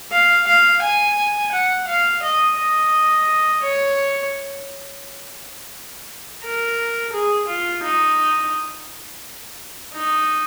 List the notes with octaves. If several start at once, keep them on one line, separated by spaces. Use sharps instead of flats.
F5
F5
G#5
F#5
F5
D#5
D#5
C#5
A#4
G#4
F4
D#4
D#4